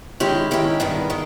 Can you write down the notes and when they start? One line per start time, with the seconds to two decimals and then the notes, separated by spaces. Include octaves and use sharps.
0.20 D#3 G#3 C#4 E4 G4
0.51 D#3 G#3 C#4 E4 G4
0.80 G2 D#3 G#3 B3 E4
1.10 D#3 G#3